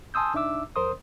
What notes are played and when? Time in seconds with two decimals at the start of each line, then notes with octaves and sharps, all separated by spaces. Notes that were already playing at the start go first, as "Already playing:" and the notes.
0.14 G#5 A5 C6 D#6 E6 G6
0.34 C2 D4 D#4 E5 D6 E6
0.76 F2 A#4 C5 C6 D#6